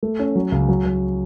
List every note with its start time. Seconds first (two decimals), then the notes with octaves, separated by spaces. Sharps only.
0.03 A3
0.19 C#4
0.35 F#3
0.52 C#2
0.68 F#3
0.85 F#3